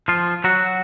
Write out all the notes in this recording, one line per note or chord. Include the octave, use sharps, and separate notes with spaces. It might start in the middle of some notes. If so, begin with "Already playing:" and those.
F3 F4
F#3 F#4